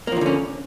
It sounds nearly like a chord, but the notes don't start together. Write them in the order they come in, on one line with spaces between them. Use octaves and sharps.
A#3 F3 D#3 D3 C#4